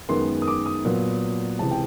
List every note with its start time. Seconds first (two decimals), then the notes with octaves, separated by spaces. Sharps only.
0.09 F#2 D#3 G#3 B3 C6
0.42 D#6
0.48 D6
0.66 D#6
0.85 A#2 F#3 B3
1.59 C#2 C3 E3 G#3 A5
1.71 G5